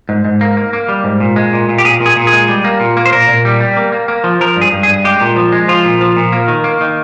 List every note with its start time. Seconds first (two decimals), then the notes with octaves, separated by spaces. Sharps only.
0.09 G#2
0.25 G#2
0.41 A#3
0.57 A#3
0.73 A#3
0.89 G3
1.04 G#2
1.20 A#2
1.36 G#3
1.53 A#2
1.69 A#2
1.78 G4
1.85 A#2 G#4
2.01 A#2
2.06 G#4
2.16 A#2
2.27 G#4
2.33 G#3
2.48 G3
2.64 A#3
2.80 A#2
2.97 A#3
3.06 C5
3.12 A#2 A#4
3.29 A#2
3.45 G3
3.60 G3
3.77 A#3
3.92 A#3
4.08 A#3
4.24 F3
4.41 F3 A#4
4.56 G2 G#4
4.72 G2
4.83 G#4
4.88 G2
5.04 G#3 G4
5.21 A#2
5.36 F3
5.52 G#3
5.68 F3 F4
5.85 A#2
6.01 F3
6.17 A#2
6.32 A#3
6.48 D#3
6.64 A#3
6.81 D#3